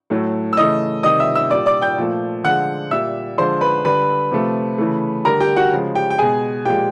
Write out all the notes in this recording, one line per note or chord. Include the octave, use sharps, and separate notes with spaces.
A2 F#3 A3
E6
C#3 E3 A3 D#5 D#6
C3 D#3 G3 D#5 D#6
E5 E6
E5 E6
A#2 G3 D5 D6
D5 D6
G5 G6
A#2 F3 A3
D3 F3 G#3 F#5 F#6
A#2 G3 E5 E6
D3 F3 G#3 C5 C6
B4 B5
D3 G3 B4 B5
C3 F3 A3
C#3 E3 A3
D3 G3 A#4 A#5
G4 G5
F#4 F#5
C#3 F3 G#3
G4 G5
G5
B2 G#3 G#4 G#5
A#2 F3 G#3 G4 G5